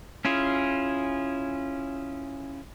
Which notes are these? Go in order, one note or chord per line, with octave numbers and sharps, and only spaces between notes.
C#4 E4 F4 G#4